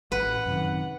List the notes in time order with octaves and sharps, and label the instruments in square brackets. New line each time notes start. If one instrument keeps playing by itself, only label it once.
[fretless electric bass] A1 [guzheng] B4 [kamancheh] F#5
[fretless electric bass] F#2 C3 D#3